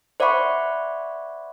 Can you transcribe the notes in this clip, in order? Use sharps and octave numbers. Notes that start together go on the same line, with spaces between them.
C5 D5 E5 F#5 B5 C#6